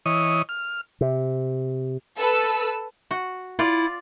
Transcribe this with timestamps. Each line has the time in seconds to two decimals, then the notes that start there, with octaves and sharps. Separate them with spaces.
0.06 E3 C#5 D#5 D#6
0.49 F6
1.01 C3
2.18 A4 B4 E6
3.11 F#4
3.59 E4 F4 D5